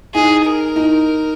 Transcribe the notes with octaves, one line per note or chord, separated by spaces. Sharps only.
D#4 G#4
A#4
D#4